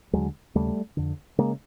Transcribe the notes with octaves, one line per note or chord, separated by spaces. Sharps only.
D#2 D3 F#3 G#3
D#2 C#3 G3 A3
F2 D3
C#3 G#3 A#3